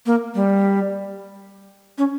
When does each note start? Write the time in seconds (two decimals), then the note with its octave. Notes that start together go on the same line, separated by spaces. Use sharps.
0.06 A#3
0.35 G3
1.98 C#4